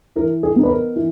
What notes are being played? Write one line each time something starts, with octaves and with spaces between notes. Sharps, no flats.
E3 A#4
G#4
B3 D#4
B4
A#4
E3